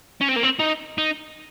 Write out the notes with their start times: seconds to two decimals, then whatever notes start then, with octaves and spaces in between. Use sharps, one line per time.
0.21 C#4
0.28 C4
0.36 A#3
0.43 C4
0.59 D#4
0.98 D#4